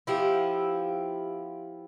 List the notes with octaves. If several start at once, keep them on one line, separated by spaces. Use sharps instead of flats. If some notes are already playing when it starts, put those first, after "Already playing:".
F3 B3 E4 G4